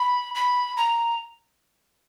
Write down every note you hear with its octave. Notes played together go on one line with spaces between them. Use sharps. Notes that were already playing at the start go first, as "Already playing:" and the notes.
Already playing: B5
B5
A#5